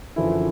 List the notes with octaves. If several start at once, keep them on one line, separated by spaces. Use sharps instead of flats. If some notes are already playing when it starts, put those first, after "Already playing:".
F#2 D3 E3 F3 E4